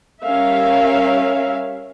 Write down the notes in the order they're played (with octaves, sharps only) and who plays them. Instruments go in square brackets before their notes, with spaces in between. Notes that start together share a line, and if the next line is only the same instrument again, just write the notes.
[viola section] G3 C#4 A#4 E5 F5